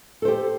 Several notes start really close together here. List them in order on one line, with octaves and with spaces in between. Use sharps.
A4 C5 G4